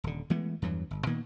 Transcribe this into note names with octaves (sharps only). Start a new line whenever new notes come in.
D#1 D3
E3 G#3 A3 B3
E2 G2 E3 F#3
G1
A#2 D#3 A#3 B3